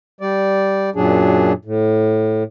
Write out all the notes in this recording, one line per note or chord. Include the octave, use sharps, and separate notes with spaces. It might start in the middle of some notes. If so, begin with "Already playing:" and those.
G3 D5
F#2 A#2 F#3 D4 G#4
A2